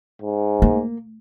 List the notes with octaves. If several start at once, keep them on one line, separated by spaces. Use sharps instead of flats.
G#2
A#3